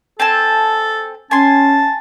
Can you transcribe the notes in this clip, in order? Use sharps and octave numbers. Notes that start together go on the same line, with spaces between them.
C4 A4 G#5 A5
C#4 G#5 A5 C6